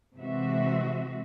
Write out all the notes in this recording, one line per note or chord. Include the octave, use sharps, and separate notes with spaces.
C3 E3 G#3 C4 F#4 E5